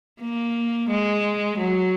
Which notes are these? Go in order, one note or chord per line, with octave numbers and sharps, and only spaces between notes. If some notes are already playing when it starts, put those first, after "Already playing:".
A#3
G#3
F#3